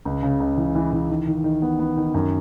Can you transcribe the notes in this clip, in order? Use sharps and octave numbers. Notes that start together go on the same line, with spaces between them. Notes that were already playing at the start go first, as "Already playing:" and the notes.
C#2
C#3
C#2
E3
E3
E3
D#3
D#3
D#3
B3
B3
D#3
F#2